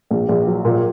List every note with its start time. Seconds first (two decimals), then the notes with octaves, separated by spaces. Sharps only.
0.11 A#1
0.29 A#1
0.47 F#3
0.65 A#2